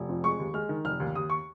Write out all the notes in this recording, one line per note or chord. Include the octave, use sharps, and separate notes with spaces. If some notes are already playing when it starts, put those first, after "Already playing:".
Already playing: F1
F2
G#3 C#6
D#2
G#3 F6
D#3
F1 F6
D#2
D#2 D#6
C#6